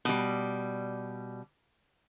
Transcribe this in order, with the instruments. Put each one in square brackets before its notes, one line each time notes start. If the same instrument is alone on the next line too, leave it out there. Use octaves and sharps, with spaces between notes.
[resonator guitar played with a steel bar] B2 G3